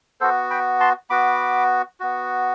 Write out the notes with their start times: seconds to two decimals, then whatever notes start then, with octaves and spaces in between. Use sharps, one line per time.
0.21 B3 F#4 A4 C5
0.50 G5 B5
0.80 A5 C6
1.10 B3 F#4 B5 D6
2.00 B3 F#4